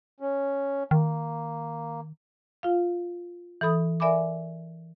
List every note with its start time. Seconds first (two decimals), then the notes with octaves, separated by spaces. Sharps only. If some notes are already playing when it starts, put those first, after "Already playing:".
0.20 C#4
0.91 D#3 A#3
2.63 F4 F5
3.61 E3 A4 B5 D#6
4.00 A#4 D5 E5 G#5 B5 D6